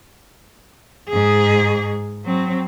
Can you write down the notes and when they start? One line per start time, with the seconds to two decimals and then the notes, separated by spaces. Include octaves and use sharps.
1.09 G#2 G#4
2.25 F#3 C4